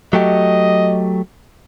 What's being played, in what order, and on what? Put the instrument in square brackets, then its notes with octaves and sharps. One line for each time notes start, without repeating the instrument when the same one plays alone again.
[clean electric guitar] F#3 A3 G4 [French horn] D#5